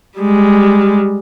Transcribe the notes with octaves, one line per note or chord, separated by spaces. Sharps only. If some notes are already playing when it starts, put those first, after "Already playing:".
G3 G#3